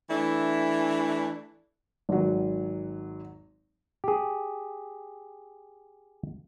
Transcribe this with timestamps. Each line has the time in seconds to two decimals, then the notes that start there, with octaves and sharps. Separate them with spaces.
0.09 E3 A3 D4 E4
2.09 G#1 F#3
4.04 G4 G#4